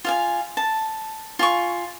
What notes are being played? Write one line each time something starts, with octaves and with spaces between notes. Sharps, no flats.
F4 F5 G#5
A5
F4 G#5 C#6